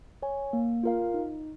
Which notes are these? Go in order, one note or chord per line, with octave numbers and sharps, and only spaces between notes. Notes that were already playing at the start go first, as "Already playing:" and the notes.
C#5 G#5
A#3
F4 A#4 F5
D#4